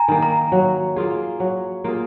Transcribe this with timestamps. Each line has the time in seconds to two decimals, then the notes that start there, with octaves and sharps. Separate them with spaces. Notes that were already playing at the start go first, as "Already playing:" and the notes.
Already playing: G#5 A#5
0.08 D#3 A#3
0.23 A#5
0.52 F#3
0.96 A#3 F4 G#4
1.40 F#3
1.84 A#3 F4 G#4